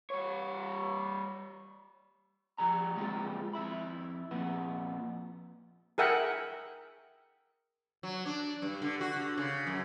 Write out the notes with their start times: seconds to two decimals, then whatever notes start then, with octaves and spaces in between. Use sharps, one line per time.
0.10 G3 C#5
2.58 F3 G3 A#5
2.96 G3 G#3 C4 F4 G#4
3.53 F2 E4 B5
4.31 F2 A#2 B3
5.98 G#4 A#4 E5 F#5 G5
8.03 F#3
8.26 D4
8.62 G2
8.82 D3
9.01 F#4
9.16 D3
9.37 C#3
9.67 F#2